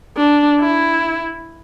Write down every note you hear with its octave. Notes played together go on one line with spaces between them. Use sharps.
D4
E4